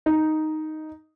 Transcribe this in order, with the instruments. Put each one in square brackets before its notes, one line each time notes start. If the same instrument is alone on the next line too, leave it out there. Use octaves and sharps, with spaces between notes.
[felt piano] D#4